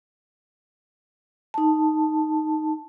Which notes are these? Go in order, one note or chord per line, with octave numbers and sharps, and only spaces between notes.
D#4 A5